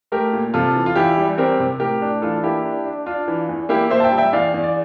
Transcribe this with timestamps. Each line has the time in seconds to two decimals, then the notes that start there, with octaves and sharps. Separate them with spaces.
0.12 A3 G4 A#4
0.33 A#2
0.54 C3 F4 A4
0.76 E3
0.86 F4
0.96 E2 E4 G4
1.17 G3
1.38 C4 G4 A#4
1.60 C3
1.80 A2 G4 A#4
2.02 D4
2.22 E3 F4 A4
2.43 A#3 E4 G4
2.65 D4
2.85 D4
3.06 D4 F4
3.28 E3
3.49 E2
3.69 A#3 E4 G4
3.90 A#2 C5 E5
4.00 A5
4.04 E5 G5
4.12 G3
4.18 E5 G5
4.33 E2 D5 F5
4.54 E2
4.64 D5